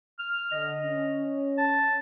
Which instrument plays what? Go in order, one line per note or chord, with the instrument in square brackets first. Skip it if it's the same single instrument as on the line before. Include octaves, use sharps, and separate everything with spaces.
[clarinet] F6
[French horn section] D3 [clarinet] D#5
[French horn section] C#4
[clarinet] A5